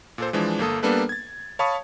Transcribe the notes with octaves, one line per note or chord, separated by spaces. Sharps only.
A#2 A4 C5
E3 F3 G#3 D4
G1 A#3 A4 D#6
G3 A#3 B3 D4 A4 B4
G#6 A6
C#5 F5 A5 B5 C#6 D#6